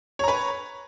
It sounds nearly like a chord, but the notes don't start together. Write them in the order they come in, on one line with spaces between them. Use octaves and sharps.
C#5 A#5 B4